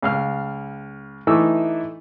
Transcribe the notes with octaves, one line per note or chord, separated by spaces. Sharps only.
C#2 F5 F6
E3 A3 D#4 E4 D6 E6